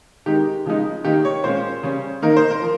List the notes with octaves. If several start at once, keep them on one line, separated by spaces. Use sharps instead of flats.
D#3 G#3 D#4 G4
C#3 F3 G#3 D#4
D#3 A#3 D#4 G4
C#5
A#2 G#3 C#4 C5
C#3 G3 C#4
D#3 A#3 D#4 A#4
C5
A#4
F3